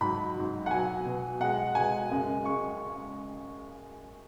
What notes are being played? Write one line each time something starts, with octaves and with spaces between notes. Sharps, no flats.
G#2 F#3 B5
G#2 F#3
F#5
B2 F#3 G#5
B2 F#3
B2 G#3 F#5
B2 G#3 G#5
F#2 C#3 G#3
C#3 G#3 C#6